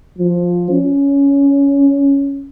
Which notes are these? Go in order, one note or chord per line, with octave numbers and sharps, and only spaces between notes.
F3
C#4